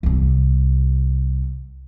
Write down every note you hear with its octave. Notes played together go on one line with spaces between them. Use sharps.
C2 C3